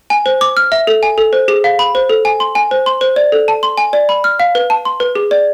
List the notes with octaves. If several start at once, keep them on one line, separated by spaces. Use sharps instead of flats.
G#5
C5
D6
F6
E5
A4
G#5
A4
C5
G#4
F5
B5
C5
A4
G#5
C6
G#5
C5
C6
C5
D5
A4
A5
C6
G#5
D5
B5
F6
F5
B4
A5
C6
B4
G#4
D5